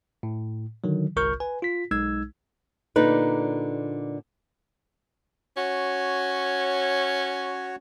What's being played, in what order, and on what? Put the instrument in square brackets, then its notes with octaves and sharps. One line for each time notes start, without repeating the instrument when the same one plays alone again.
[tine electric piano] A2
D3 D#3 F#3
G1 C2 A#4 C#6 F6 G6
B4 G#5
F4 B6
B1 G#3 D#4 E6 G#6
[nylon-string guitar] A#2 D3 D#4 B4
[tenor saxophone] C#4 [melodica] F#4 C#5